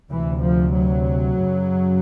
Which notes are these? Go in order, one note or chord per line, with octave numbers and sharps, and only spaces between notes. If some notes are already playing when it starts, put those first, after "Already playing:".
D2 C3 E3
F3
F#3
F#2 C#3